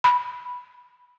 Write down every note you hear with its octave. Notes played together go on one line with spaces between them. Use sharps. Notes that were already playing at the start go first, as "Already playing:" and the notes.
B5